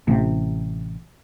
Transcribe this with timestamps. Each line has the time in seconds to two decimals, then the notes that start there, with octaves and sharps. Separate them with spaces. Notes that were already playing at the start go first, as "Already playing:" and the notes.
0.07 A1 C3